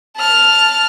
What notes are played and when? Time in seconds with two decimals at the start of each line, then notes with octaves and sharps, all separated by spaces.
0.17 A5 F6